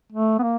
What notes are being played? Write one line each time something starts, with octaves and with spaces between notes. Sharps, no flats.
A3
B3
A#3